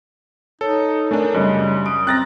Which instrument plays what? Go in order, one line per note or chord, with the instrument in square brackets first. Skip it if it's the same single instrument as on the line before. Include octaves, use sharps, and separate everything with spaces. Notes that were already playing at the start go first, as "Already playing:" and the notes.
[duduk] D#4 [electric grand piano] A4 [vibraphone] C#5
[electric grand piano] A3 D4 [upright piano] A#4 G#5
[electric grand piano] F#2 [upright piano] C#3 D#5 F#6 [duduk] G3
[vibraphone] D#6 [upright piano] D7
[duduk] C4 [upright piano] G5 A#5 F6 [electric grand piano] F#6 A6 A#6